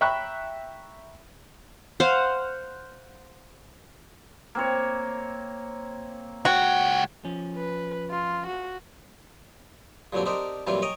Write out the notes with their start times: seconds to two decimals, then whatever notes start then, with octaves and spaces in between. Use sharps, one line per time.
0.01 E5 G5 A#5 B5 C#6 F#6
2.00 C5 F5 F#5
4.55 A#3 C4 C#5
6.45 C#2 F#4 C#5 G5
7.25 F3 C#4
7.56 B4
8.11 F4
8.47 F#4
10.13 G2 A#2 D3 F#3 C4 D4
10.25 C4 D4 D#4 G4 A#4 C5
10.67 F#2 A#2 E3 G3 C4 F4
10.82 C#5 D#5 G5 G#5 A#5